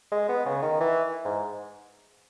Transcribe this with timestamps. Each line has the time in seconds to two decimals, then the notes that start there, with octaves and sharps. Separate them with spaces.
0.12 G#3
0.29 B3
0.46 C#3
0.62 D#3
0.80 E3
1.25 G#2